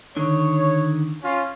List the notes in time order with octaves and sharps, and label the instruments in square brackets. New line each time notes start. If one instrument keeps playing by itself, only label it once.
[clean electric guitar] D3 D#3 [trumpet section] C#5
[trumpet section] C#4 F4